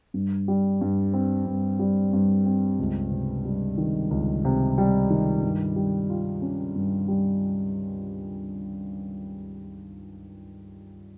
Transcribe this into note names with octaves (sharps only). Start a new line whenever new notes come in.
G2
G3
G2
C4
G2
G3
G2
C4
C#2
C3
G3
D#3
C#2
C3
G3
D#3
G2
G3
F4
C#4
G2
G3